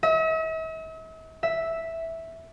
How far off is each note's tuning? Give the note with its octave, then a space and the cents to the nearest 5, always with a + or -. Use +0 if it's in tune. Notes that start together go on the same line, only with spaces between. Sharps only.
E5 -45
E5 -5